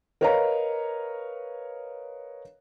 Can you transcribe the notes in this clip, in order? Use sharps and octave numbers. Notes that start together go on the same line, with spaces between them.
A#4 B4 C#5 D#5 F5 A#5